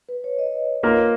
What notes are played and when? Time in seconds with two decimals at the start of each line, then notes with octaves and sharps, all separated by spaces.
0.09 B4
0.24 C#5
0.39 D#5
0.83 A#3 F4 A#4